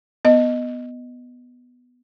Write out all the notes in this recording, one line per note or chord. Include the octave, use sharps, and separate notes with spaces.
B3 D#5